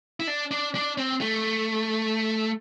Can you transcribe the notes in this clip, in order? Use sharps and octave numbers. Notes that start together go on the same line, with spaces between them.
E4
D4
D4
D4
C4
A3